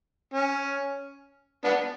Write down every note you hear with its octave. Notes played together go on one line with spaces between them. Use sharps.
C#4
B3 D4